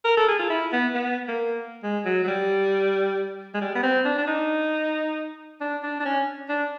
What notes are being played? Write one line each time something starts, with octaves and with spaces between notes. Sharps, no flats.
A#4
A4
G#4
F4
E4
B3
B3
A#3
G#3
F#3
F#3
G3
G#3
G3
B3
C4
D4
D4
D#4
D4
D4
D4
C#4
D4